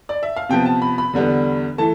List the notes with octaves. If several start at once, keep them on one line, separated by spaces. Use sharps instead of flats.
D5
E5
F5
C3 F3 B3 G5
A5
B5
B5
E2 D3 G3 B3
E3 A3 A5